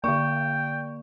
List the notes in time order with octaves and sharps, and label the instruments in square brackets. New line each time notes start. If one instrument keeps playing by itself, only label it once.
[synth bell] D3 D5 [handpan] A#3 [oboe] G5 [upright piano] C#6